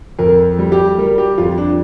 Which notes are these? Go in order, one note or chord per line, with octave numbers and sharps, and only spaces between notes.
F2 A#4
G3
G4
G3 A#4
G4
F2 F4
D4